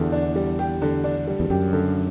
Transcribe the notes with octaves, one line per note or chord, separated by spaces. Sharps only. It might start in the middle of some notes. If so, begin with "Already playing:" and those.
Already playing: E2 D3 G4
D4
G3
G4
D3
D4
G3
E2
F#2 G4
D3